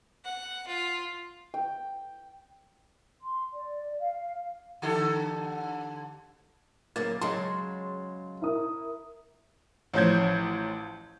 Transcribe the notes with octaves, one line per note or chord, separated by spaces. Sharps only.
F#5
F4
G5
C6
D5
F5
D3 G4 A4
C#3 F#3 A#3 D6 A6
C#3 F#3 G#3 C6
E4 A#4 D#6
A1 F3 C#4 C5 G6 G#6